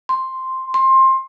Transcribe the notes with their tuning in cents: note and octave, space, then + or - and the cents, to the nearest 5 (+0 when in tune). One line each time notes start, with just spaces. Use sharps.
C6 +0
C6 +20